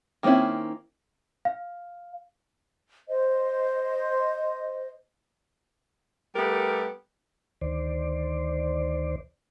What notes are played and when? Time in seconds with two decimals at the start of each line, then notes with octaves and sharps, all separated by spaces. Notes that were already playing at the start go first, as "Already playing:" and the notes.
0.23 D#3 A#3 C4 C#4 E4
1.45 F5
3.08 C5 D#5
6.35 G3 A3 B3 G4 A#4
7.61 D2 D#3 C5 D5